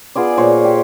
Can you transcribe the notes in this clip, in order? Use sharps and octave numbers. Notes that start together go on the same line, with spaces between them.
B3 F4 G#4 D5
A#2 C5 C#5
G4